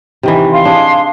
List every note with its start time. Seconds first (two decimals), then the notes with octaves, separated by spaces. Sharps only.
0.23 C3 D#3 E3
0.52 F5 C6
0.65 D4 G#4